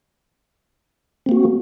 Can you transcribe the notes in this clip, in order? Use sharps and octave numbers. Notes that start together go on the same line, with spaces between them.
A#3 C4 F#4